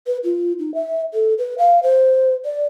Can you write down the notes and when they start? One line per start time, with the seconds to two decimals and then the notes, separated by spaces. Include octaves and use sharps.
0.07 B4
0.24 F4
0.59 D#4
0.74 E5
1.14 A4
1.38 B4
1.58 F5
1.83 C5
2.45 D5